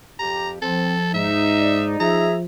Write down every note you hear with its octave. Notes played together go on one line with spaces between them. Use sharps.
F2 G4 A#5
F3 C4 A4
G#2 D#4 E5
D5
F3 G#4 E5 A#5